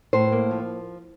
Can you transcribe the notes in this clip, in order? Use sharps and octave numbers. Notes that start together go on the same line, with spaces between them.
A2 C5
A#3
F3